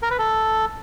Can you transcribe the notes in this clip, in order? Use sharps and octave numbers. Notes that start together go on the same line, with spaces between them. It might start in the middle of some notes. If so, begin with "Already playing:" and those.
A#4
B4
A4